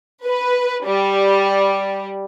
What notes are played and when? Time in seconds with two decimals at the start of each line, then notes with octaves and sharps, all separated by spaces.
0.24 B4
0.85 G3